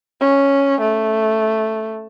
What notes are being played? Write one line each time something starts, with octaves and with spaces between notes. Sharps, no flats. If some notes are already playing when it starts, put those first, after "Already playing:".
C#4
A3